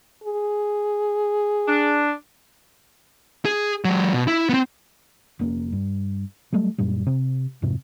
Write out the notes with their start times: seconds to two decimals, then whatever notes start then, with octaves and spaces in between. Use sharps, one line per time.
0.24 G#4
1.67 D4
3.45 G#4
3.85 F#3 G#3
4.13 B2
4.28 E4
4.49 B3 C4
5.39 F1 A#3 C#4
5.72 G2
6.53 F#3 G3 A3
6.78 F#2 A#2 G3
7.06 C3
7.62 F2 G#2 C3 C4